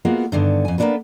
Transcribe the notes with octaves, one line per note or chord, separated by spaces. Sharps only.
G#3 A#3 B3 F4 F#4
G2 D3 D#3 B3
F2 G#5
A#3 B3 C#4 D4 A4 B4